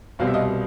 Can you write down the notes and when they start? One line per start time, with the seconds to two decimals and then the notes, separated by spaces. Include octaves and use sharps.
0.19 C2 B2 G3 C4 F5
0.27 E5
0.34 D#5 F5